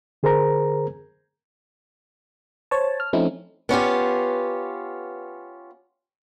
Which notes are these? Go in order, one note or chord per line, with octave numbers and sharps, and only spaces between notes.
D3 G#4 A#4 C5 A#5
C5 C#5 A5
F6
F3 A3 C4 C#4 D#4 E4
B3 C#4 F4 G4